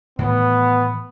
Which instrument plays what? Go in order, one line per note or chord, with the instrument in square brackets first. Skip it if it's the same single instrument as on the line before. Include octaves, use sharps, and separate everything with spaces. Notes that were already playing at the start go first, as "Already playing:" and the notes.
[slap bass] A2 D#3 E3 [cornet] B3